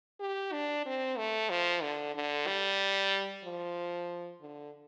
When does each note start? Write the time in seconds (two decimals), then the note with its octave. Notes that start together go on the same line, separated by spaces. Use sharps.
0.20 G4
0.53 D4
0.86 C4
1.18 A3
1.50 F3
1.82 D3
2.15 D3
2.47 G3
3.44 F3
4.41 D3